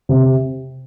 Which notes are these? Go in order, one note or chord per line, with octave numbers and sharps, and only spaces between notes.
C3